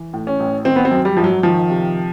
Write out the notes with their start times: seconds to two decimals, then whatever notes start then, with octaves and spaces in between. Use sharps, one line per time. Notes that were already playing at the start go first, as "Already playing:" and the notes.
Already playing: E3
0.14 A2
0.27 C#4
0.40 A1
0.65 D#3 C4
0.76 B3
0.85 C4
0.91 F#2
1.05 G3
1.17 G#1 F3
1.24 F#3
1.43 D#3 F3
1.70 C3